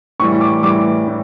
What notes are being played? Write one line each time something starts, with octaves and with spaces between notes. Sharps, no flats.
A2 E3 G3 C#6
D6
A2 E3 G3 D6
A2 E3